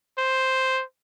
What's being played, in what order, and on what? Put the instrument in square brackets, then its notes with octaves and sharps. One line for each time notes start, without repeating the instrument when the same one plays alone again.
[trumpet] C5